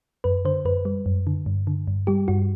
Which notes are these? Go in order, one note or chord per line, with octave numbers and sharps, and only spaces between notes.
F#2 B4
D3 C5
F#2 B4
G3
F#2
D3
G2
D3
G2
G3 G4
G2 F#4